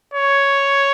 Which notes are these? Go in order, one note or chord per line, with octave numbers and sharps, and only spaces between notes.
C#5